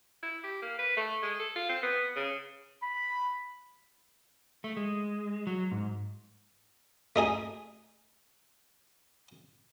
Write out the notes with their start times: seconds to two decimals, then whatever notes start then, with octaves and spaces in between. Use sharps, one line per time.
0.22 E4
0.43 G4
0.62 A#3
0.79 B4
0.97 A3
1.22 G#3
1.39 A4
1.55 F4
1.69 C4
1.83 B3
2.16 C#3
2.82 B5
4.64 A3
4.77 G#3
5.47 F#3
5.71 G#2
7.16 A3 D#4 G#4 G#5